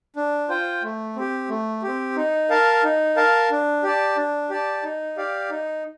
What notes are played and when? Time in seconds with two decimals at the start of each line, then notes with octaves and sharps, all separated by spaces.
0.16 D4
0.49 F4 C5 G5
0.83 A3
1.16 C4 G4
1.49 A3
1.82 C4 G4
2.16 D#4
2.50 A#4 F5 A5
2.83 D#4
3.16 A#4 F5 A5
3.51 D4
3.83 G4 D5 A5
4.17 D4
4.50 G4 D5 A5
4.83 D#4
5.17 G4 D5 F5
5.50 D#4